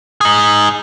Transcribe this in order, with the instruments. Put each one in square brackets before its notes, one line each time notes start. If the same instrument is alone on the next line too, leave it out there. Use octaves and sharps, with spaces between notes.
[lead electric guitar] D#4 G#4